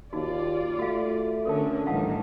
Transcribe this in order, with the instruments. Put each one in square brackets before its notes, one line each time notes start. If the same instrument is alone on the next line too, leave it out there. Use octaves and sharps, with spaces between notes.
[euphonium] D#2 [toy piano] D#4 F#4 [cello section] F4 D5
[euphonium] A3 [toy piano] F#4 F5
[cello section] D3 C#4 [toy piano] A4 A#4 A5
[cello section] A2 D#3 G3 [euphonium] E3 [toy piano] F5 F#5 A5